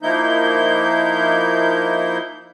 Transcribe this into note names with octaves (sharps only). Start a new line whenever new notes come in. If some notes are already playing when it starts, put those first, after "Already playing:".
F3 A#3 D#4 E4 G6